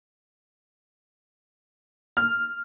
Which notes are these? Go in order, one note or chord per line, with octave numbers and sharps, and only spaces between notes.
F6